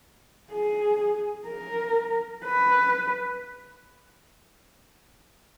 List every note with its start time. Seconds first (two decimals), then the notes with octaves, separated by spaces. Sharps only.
0.52 G#4
1.47 A#4
2.44 B4